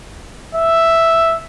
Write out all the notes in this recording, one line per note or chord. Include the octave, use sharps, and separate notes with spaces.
E5